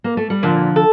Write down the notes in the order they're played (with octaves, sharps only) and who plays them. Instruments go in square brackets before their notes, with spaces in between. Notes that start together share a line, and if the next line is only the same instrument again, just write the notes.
[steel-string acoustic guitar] A#3
A3
G3
[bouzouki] A#2 [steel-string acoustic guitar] D3 F3
[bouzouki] A4